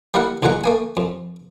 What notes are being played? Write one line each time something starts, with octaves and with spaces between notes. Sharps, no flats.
G3 A#3 E4 A#4 F#5
B1 E2 A#2 G#3 F#5 A#5
A3 A#3 G#5
F2